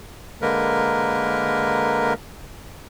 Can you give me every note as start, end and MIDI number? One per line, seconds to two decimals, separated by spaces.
0.42 2.13 50
0.42 2.13 56
0.42 2.13 58
0.42 2.13 70
0.42 2.13 71